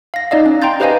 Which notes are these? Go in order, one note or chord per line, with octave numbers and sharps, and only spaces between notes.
F5 A#6
D#4 D5 D#5 F5
C#4
G5 A#5 C6 G6 A6
G4 B4 C5 D#5 F5 G#5